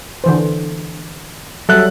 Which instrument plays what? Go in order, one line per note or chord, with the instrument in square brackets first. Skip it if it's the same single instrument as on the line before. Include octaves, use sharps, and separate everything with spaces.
[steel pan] D3 E3 C5
[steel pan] F#3 G3 [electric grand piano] A4 E5 F#6